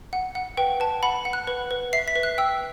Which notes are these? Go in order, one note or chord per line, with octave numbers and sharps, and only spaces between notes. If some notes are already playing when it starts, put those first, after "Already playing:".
F#5
F#5
B4 G5
B4 A5
F#5 B5
F#5
F#6
B4
B4
E5 C7
B6
B4
F#6
G5 E6